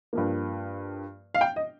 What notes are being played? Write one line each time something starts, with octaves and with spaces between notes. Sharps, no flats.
G2 F3 A#3
F5
G5
D#5